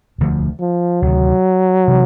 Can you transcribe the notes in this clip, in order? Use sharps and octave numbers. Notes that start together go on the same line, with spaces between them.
E1 D2 D3 F3
F3
D2 C3 D#3 F#3
C3 E3